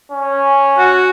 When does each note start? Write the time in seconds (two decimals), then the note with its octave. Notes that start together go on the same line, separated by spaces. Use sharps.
0.12 C#4
0.78 F#4